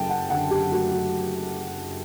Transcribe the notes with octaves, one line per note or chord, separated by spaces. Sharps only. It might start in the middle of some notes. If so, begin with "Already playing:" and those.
Already playing: F#1 F#2 A3 G5 A5
F#5
D3 F#5
G4
A3 F#4
F#4